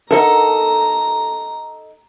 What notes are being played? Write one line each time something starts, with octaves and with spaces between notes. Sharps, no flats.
D#4 A4 A#4 F#5 A#5